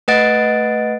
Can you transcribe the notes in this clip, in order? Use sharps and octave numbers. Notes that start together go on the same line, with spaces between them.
A3 B4 D#5 F#5 A6 D7